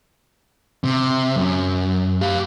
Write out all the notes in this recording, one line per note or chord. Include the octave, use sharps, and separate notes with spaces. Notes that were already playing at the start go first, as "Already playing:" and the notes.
C3
F#2
G4 F5